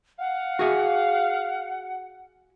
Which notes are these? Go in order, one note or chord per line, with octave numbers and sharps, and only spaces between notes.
F5 F#5
F#4 G#4 E5